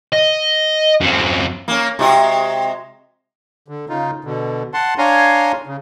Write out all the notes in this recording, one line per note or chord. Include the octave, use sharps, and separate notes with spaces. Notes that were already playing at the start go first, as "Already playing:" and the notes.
D#5
F#2 C4
A#3 C#4
C3 G#3 F#4
D3
C#3 D#4 F4
B2 D3
F#5 A5 C6
D4 C#5 F5 G#5 A#5 C6
C#3